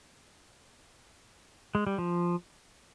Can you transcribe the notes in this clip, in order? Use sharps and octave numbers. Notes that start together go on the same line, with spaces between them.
G#3
G3
F3